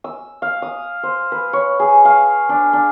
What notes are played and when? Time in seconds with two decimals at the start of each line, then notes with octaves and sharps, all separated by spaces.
0.04 E6
0.42 F5
0.62 D#6
1.03 C5
1.32 B4
1.53 C#5
1.80 G#4
2.05 F5
2.49 D4
2.73 D4